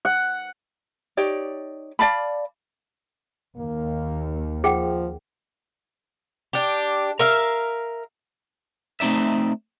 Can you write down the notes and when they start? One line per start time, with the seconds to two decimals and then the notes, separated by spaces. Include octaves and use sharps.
0.05 F#5
1.17 D#4 G4 C#5 D5
1.99 D5 F5 A5 B5
3.57 D#2 A#3
4.64 F3 G#4 F#5 G5
6.53 D4 G4
7.19 A#4 E5 F5
9.00 A3 C4 D#4 D5 E5